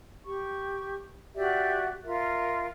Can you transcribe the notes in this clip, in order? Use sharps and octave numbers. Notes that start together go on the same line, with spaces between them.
G4 C#6
F#4 G4 D5 E5
F4 A#4 E5